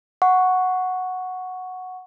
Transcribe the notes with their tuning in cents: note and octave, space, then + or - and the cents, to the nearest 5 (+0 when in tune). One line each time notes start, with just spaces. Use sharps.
F#5 -5 C#6 +5